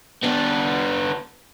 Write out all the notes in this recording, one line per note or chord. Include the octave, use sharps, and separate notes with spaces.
B3 D4